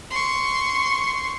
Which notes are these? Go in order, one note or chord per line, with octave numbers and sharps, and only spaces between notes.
C6 C#6